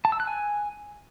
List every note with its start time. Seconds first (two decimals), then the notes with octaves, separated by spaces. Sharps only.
0.05 A5
0.12 E6
0.20 F#6
0.27 G#5